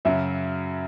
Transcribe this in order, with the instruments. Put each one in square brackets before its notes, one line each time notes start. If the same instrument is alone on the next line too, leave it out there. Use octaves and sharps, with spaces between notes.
[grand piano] F#2 C#3 F#3 [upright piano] E5